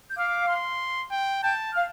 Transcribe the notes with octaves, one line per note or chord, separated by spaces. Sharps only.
G6
F5 D6 F6
C6
G5
G5 A5 G6
F5 F6